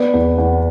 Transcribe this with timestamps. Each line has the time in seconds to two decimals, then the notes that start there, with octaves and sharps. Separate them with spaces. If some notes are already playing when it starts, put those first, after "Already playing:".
Already playing: B3 D5
0.13 E2
0.38 E2